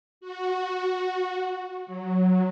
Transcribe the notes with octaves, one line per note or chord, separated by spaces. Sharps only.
F#4
F#3